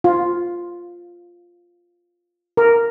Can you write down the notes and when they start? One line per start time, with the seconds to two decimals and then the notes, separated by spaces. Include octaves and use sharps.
0.04 F4
2.57 A#4